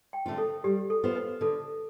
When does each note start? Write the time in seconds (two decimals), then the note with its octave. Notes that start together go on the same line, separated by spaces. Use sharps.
0.13 G5
0.26 D3 A3 C4 F4
0.38 A4
0.64 G3 G4
0.90 A4
1.04 B3 F4 C5
1.16 B4
1.41 D3 A4